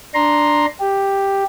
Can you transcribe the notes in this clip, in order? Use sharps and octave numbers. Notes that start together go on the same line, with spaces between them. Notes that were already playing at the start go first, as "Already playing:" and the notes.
D4 A#5 C6
G4